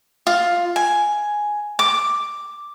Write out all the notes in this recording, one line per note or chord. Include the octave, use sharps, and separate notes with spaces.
F4
G#5
D6